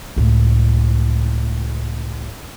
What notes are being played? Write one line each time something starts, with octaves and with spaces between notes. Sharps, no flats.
C#2 A2